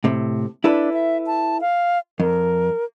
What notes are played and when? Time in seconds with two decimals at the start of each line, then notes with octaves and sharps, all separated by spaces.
0.04 A2 C3
0.64 D4 E4 A4 B4
0.93 E5
1.27 A5
1.61 F5
2.20 F2 A#4